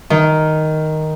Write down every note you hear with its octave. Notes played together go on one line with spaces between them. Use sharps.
D#3